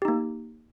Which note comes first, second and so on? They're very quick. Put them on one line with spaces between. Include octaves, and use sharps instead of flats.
G4 D#4 A#3